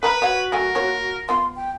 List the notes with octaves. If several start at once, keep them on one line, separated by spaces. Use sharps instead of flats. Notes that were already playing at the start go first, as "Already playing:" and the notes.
A#4 B4 A#5 B5
F#4 C5 C#5 F#5
F#3 A3 A#4 G#5
A#3 F4 C#5
B3 F4 F5 C6
G5